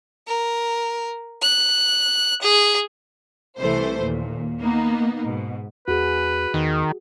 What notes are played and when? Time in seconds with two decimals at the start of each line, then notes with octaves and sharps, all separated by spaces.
0.28 A#4
1.42 F#6
2.42 G#4
3.59 C2 C3 E3 A3 C5
4.00 D#2 A#2
4.59 A#3 B3 D#4
5.23 G#2 B2
5.88 E2 F#4 G#4 B4
6.54 E2 D#3